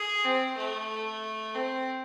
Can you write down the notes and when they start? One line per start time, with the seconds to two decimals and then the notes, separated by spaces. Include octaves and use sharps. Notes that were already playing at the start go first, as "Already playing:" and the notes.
Already playing: G#4
0.25 C4
0.57 A3
1.55 C4